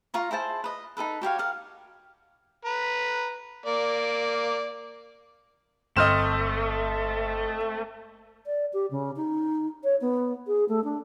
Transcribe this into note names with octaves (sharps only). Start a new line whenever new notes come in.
F4 F5 A#5 C#6
E4 G#4 C5 A5
B4 D#5
D#4 G#4 A4 B4
F#4 G4 C#5 F5
A#4 F5 F#5
B4 A#5
A#3 D5
G1 A3 C4 D#5 F6 E7
D5
G4
C#3
D#4
C#5
B3
G#4
A3
D4